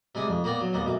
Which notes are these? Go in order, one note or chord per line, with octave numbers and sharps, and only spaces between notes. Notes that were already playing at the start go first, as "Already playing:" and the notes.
C3 G3 G#3 G#5 D6 D#6
F2
A#3 B3 A#4 D5 G5
F#3
D#2 G3 A#3 B3
B1 F#2 D6